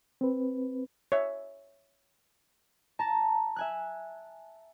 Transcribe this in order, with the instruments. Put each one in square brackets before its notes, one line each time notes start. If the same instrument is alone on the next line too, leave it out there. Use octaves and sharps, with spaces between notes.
[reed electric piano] C4 B4
[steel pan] C#5 E5
[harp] A5 A#5
E5 G#5 F#6